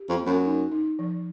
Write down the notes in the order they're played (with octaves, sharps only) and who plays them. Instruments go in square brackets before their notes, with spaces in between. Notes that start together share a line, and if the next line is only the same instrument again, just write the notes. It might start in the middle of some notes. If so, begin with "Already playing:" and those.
Already playing: [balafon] G4
[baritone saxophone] F2
[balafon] A#3
[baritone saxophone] F#2
[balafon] D#4
D#4
F3